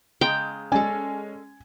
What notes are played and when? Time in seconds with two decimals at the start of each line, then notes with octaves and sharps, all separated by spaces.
0.21 C#3 G#3 G5 A#5
0.72 G#3 C#4 A4 D5 G#5